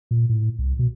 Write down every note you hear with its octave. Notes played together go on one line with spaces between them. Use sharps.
A#2
A2
C2
B2